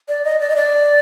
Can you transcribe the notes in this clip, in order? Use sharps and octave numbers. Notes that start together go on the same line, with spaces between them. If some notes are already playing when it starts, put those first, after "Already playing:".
D5
D#5
D5
D#5
D5